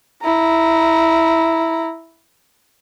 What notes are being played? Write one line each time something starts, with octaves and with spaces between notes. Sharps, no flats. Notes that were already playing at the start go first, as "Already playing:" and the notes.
E4 A#5